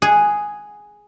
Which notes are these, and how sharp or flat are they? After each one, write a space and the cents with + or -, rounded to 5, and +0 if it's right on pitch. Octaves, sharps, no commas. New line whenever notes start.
G#4 +0 F#5 +0